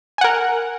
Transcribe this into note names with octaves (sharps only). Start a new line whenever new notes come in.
A#4 F#5 G#5